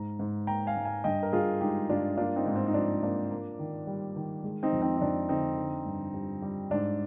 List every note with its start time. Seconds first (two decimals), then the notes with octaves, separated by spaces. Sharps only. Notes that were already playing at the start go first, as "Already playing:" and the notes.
Already playing: G#2 A#5
0.19 G#2
0.47 A#3 G5 A#5
0.67 F5 G#5
0.76 G#2
0.85 F5 G#5
1.04 G2 D#5 G5
1.23 A#4
1.33 G2 F4 G#4
1.61 G#3 D#4 G4
1.89 G2 D4 F4
2.17 A#3 D4 F4
2.36 C4 D#4
2.46 G#2
2.56 C4 D#4
2.67 D#4
2.74 F3 D4
3.03 A#3 D4
3.31 A#3
3.59 D#3
3.87 G3
4.16 D#3
4.44 G#3
4.63 C4 D#4
4.72 F2
4.82 C4 D#4
4.97 D#4
5.01 F2 D4
5.29 D3 C4 D#4
5.57 D3
5.86 G2
6.14 G3
6.42 G3
6.71 G#2 D4